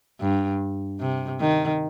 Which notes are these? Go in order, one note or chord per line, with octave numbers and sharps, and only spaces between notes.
G2
C3
D#3